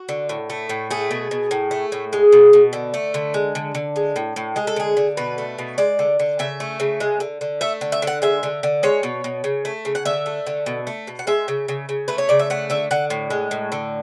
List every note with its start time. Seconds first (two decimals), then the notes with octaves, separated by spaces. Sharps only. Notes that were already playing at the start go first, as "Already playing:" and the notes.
Already playing: F#4
0.09 D3
0.29 A2
0.50 A3
0.69 A2
0.91 A3 G#4
1.11 B2
1.31 B2
1.51 A2
1.71 A3
1.92 A2
2.13 G#3
2.32 B2
2.53 B2
2.73 D3
2.94 A3
3.14 D3
3.34 G#3
3.55 D3
3.75 D3
3.96 G#3
4.16 A2
4.36 A2
4.56 G#3 G#4
4.67 A4
4.76 D3 G#4
4.97 D3
5.17 B2 B4
5.38 A3
5.58 B2
5.78 G#3 D5
5.99 D3
6.19 D3
6.39 C#3 E5
6.60 A3
6.80 C#3
7.00 G#3
7.20 D3
7.41 D3
7.61 A3 E5
7.81 D3
7.92 E5
8.02 D3
8.07 F#5
8.22 G#3 E5
8.43 D3
8.63 D3
8.83 G#3 C#5
9.03 B2
9.24 B2
9.44 C#3
9.65 A3
9.85 C#3
9.95 F#5
10.05 D3 E5
10.26 A3
10.47 D3
10.66 B2
10.87 A3
11.07 B2
11.19 F#5
11.27 G#3 E5
11.48 C#3
11.68 C#3
11.89 C#3
12.08 A3 B4
12.18 C#5
12.29 C#3 D5
12.39 E5
12.50 A3 F#5
12.70 D3 E5
12.91 D3 F#5
13.10 A2
13.30 G#3
13.51 A2
13.72 D3